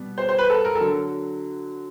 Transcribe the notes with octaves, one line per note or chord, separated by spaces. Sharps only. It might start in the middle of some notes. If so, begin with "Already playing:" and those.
Already playing: B2 G3 B3
C5
C5
B4
A4
A#4
A4
D3 F#3